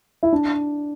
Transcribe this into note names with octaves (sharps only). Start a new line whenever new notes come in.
E4
D4